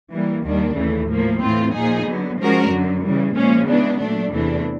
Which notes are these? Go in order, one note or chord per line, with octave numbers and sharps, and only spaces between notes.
E3 G3 A#3
D#2 D#3 G3 A#3 D4
D#2 C#3 E3 A3
A2 F3 A#3
A2 E3 A3 C4 F4
A#2 F3 A#3 D#4 G#4
D3 F#3 B3
F3 G#3 C#4 F#4 A#4
F#2 D3 F#3
C#3 E3 G3
A#2 F3 G#3 C#4
C#3 E3 G#3 B3 D4
A#2 F#3 A3 D4
E2 C3 E3 A3 D4